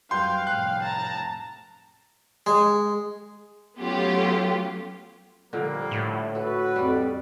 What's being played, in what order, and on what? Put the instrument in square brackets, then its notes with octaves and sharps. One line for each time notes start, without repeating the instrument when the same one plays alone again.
[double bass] F#2 G3 [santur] B4 G5 [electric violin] F5 [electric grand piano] C6
[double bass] F1 A2 [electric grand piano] F#6
[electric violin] A5 A#5
[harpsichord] G#3
[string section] F#3 A3 B3 C#4 F4 G4
[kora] A#2 D3 [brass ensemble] F3 G3 A#3
[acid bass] A2
[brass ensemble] F#4 B4 [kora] A4
[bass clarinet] F2 [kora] G3 D5